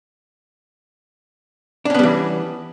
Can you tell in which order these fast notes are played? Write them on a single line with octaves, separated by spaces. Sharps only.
D4 C#4 B3 G3 E3